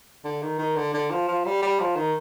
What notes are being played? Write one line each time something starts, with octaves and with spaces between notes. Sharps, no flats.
D3
D#3
D#3
D3
D3
F3
F3
G3
G3
F3
D#3